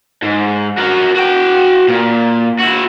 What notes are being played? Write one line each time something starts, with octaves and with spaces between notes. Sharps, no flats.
G#2
F#4 A#4
F#4 G5
A#2
E4 F#4